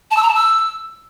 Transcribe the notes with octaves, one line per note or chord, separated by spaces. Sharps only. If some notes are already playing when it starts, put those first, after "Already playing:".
A5
E6
A#5
A5
E6